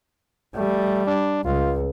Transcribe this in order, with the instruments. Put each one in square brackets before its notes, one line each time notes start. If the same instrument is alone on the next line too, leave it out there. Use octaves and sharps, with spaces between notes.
[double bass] G3 [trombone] A3
[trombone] D4
[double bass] C#2 [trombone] F4